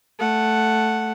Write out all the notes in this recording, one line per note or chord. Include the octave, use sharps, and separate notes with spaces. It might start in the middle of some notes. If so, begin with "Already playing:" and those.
A3 F#5